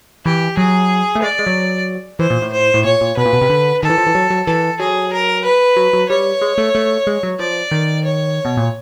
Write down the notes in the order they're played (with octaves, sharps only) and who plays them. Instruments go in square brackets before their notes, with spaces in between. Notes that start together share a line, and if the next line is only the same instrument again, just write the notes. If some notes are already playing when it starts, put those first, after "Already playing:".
[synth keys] E3 [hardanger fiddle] G4
[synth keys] F#3 [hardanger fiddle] G#4
[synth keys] A3
[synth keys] G#3 [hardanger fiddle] D5
[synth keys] G#3
F#3
[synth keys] E3 [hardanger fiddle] C5
[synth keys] A#2
A2
[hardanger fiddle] C5
[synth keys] A2
[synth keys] A#2 [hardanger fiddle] C#5
[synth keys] A#2
[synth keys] B2 [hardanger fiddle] B4
[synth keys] A#2
B2
C3
D3
[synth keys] D#3 [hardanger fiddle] A4
[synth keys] E3
F3
E3
F#3
F#3
[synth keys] E3 [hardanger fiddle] A4
[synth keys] F#3 [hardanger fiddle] G#4
[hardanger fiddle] A#4
B4
[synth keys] F#3
F#3
[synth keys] G3 [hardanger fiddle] C#5
[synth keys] G#3
A3
A3
G#3
F#3
[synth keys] F3 [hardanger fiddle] D5
[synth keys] D#3
[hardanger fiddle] C#5
[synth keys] B2
A#2